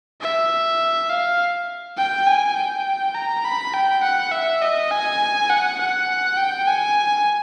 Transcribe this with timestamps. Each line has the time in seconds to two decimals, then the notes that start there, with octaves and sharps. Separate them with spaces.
0.21 E5
1.09 F5
1.97 G5
2.27 G#5
2.56 G5
3.15 A#5
3.44 B5
3.73 G5
4.03 F#5
4.32 E5
4.62 D#5
4.91 G#5
5.50 F#5
5.79 F#5
6.37 G5
6.67 G#5